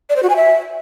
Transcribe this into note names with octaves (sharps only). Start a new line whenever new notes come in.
D5
C5
F#4
G#5
E5